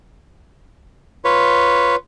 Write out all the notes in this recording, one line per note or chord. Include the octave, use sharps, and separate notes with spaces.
F4 B4 C#5